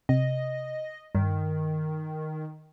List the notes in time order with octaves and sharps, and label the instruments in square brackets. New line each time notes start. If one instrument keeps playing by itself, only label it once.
[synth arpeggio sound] C3 [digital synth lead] D#5
[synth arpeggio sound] G2 [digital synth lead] D#3